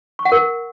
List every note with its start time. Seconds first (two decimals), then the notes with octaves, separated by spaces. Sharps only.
0.19 C#6
0.25 F#5
0.32 A#4